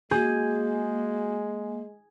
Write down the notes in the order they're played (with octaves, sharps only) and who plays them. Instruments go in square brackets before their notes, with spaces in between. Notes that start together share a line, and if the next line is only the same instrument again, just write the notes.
[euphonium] G#3 [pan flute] A#3 [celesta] F#4 G6 [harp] G#4